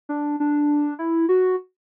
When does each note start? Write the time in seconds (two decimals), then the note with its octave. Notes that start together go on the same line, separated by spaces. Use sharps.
0.09 D4
0.40 D4
0.99 E4
1.29 F#4